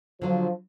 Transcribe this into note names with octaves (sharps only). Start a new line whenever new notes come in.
D3 F3 F#3 D4